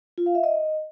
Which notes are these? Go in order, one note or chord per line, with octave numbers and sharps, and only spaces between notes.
F4
F5
E5
D#5